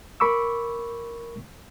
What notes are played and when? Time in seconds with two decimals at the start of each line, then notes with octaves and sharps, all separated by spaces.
0.20 A#4 B5 C#6 D6 E6